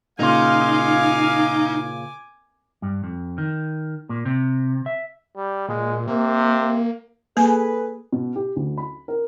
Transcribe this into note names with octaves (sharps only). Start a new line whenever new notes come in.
A#2 C#3 D#4 F4 F5 G#5 D6
G2
F2
D#3
A#2
C3
E5
G3
A#2 G#3
C3 A#3
A#3 G#4 A4 B4
B2
G4
D2
B5
A#4